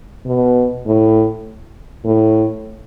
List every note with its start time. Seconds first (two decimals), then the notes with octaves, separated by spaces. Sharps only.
0.26 B2
0.86 A2
2.05 A2